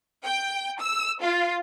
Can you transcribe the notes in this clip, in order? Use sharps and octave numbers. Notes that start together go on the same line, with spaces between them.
G5
E6
F4